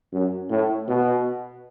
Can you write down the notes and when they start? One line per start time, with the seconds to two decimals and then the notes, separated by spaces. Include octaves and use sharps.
0.13 F#2
0.50 A2
0.88 B2